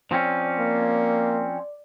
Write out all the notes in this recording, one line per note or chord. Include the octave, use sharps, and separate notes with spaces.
F3 C4 C#4 D5
A#3